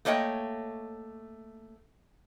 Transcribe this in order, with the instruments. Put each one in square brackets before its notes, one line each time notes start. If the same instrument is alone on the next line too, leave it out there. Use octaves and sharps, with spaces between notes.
[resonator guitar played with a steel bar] A3 A#3 C#5 D#5 G5